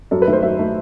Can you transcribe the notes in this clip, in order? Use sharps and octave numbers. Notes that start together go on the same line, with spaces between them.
F#2 A4
B4
D#3 A3
C5
F#2 E5
D#3 A3